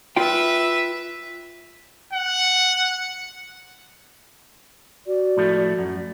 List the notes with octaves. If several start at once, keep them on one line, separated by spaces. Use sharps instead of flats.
F4 B4 E5 G5
F#5
F#4 D5
A2 F3 A3
F#2